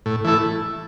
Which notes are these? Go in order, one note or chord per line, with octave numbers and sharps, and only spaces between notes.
A2
E3 A3 E4